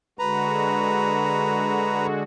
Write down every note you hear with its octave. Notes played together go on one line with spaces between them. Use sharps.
D3 G#3 F#4 B4 A#5